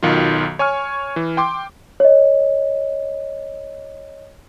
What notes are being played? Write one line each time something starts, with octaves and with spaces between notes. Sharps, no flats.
B1 D#3 F#3 F4
C#5 G#5 C#6 F6
E3
G5 C6 D6
C#5 D#5